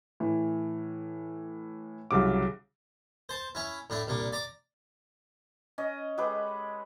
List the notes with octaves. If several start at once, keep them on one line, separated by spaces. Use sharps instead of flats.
A2 E3
C2 C#3 F#3 D6
C5 A5
C#4 E4
A2 D4 E4
C2 A#2 D4
D5 A#5 D6
C#4 D#5
G#3 G4 A4 B4